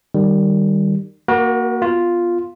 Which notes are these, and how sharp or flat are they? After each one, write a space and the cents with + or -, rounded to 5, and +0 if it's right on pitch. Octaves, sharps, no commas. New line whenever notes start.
D#3 -20 G3 +0
A#3 +0 F#4 +0 A#4 +45
B3 +0 F4 +0